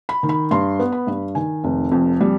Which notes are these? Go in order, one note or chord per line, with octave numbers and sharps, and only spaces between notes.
B5
D#3
B5
G2 C6
B3
B5
G2
D#3 G#5
F1
F2
G3